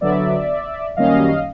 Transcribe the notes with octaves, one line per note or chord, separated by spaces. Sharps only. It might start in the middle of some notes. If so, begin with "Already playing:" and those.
D3 F#3 B3 D5 E5
F#2 D#3 G3 A#3 C#4 D#5 F5